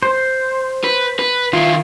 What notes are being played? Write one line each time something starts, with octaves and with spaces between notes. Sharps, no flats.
C5
B4
B4
D#3 E4 F4